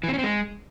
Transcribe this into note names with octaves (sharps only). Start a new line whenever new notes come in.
E3
C4
C#4
C4
G#3